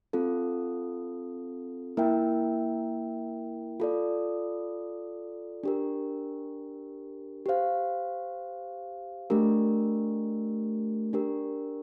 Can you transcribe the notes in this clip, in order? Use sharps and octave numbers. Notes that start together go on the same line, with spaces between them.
C4 F4 A4
A#3 E4 A#4 E5 G5
F4 A4 D5
D4 G4 A#4
G4 C5 F5
A3 D4 G4 A#4
D4 G4 A#4